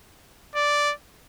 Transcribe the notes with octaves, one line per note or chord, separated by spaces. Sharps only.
D5